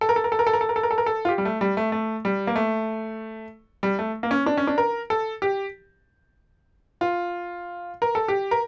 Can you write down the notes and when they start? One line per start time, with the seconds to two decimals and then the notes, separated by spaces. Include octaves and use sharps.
0.01 A4
0.09 A#4
0.16 A4
0.24 A#4
0.32 A4
0.39 A#4
0.47 A4
0.53 A#4
0.61 A4
0.69 A#4
0.76 A4
0.83 A#4
0.91 A4
0.98 A#4
1.06 A4
1.25 F4
1.29 G4
1.38 G3
1.45 A3
1.61 G3
1.77 A3
1.92 A3
2.25 G3
2.47 A#3
2.56 A3
3.83 G3
3.99 A3
4.23 A#3
4.31 C#4
4.46 D4
4.57 C#4
4.67 D4
4.78 A#4
5.10 A4
5.42 G4
7.01 F4
8.02 A#4
8.15 A4
8.28 G4
8.51 A#4